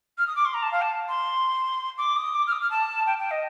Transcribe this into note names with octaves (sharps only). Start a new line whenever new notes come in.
F6
D#6
D6
C6
A#5
A5
F5
A5
C6
D6
D#6
D6
F6
D#6
F6
A5
G5
G5
D#5